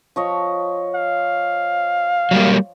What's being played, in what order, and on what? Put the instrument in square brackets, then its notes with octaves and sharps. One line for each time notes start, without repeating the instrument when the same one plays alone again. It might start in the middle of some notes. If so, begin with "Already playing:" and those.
[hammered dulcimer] F3 C#5 D#5
[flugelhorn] F5
[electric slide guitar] F#3 G3 A#3